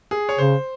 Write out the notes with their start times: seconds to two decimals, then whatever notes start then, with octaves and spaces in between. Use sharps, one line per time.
0.11 G#4
0.29 C#5
0.38 C#3 C5